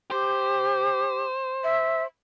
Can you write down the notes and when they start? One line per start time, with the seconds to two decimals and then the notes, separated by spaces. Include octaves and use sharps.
0.11 G4 C5
1.64 E5